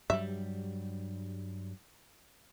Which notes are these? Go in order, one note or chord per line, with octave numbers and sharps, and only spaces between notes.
G2 F#3 G3 E5